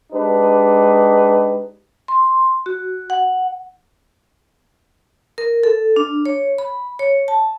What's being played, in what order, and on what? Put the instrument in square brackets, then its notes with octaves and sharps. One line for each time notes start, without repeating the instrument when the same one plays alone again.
[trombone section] G#3 D4 D#4 G4 B4
[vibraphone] C6
F#4
F#5
A#4
A4
D4
C#5
B5
C#5
A5